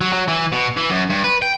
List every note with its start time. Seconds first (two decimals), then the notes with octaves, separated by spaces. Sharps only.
0.01 F#3
0.13 F#3
0.28 E3
0.52 B2
0.77 E3
0.90 F#2
1.10 G2
1.24 B4
1.42 G5